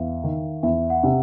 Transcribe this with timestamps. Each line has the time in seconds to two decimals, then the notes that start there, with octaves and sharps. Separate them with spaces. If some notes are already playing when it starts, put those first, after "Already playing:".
Already playing: E2 E5 F5
0.24 D#3
0.63 E2 E5
0.90 F#5
1.03 C3